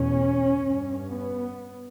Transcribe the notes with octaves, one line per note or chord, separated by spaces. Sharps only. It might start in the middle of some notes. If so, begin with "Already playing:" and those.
Already playing: E2 B2 C#4
G2
B3